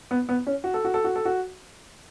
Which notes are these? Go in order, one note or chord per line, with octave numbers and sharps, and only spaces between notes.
B3
B3
C#4
F#4
A4
F#4
A4
F#4
A4
F#4